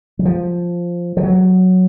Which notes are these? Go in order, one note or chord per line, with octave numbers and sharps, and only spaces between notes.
F#3
F3
F3
F#3